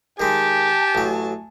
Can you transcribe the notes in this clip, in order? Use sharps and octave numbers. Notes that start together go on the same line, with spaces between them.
D#3 G#3 G4 G#5 A5
A1 F#3